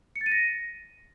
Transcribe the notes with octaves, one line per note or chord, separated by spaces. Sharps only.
C#7
A6
D#7
A#6